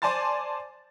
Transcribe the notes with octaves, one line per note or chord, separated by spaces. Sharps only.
C5 D5 G#5 A5 C6 A6